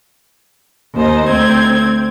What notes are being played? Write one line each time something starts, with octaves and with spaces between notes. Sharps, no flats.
D#2 D#4 C5 D#5
D2 C4 G#6